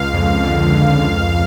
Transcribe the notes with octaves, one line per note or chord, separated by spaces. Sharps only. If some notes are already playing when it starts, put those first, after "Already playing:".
Already playing: C#2 F5
F2
D3
F2
C#2